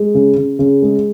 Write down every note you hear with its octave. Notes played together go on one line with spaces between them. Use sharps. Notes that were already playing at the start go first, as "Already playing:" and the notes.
Already playing: G#3
C#3
C#3
C#3
G#3